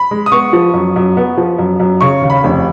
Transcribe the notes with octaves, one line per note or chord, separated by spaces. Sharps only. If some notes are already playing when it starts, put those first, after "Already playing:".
Already playing: B5
G#3
D#6
B3 C#6
F3
F#2
F#2
B3
F3
F#2
F#2
C#3 C#6
D#2
B5
F1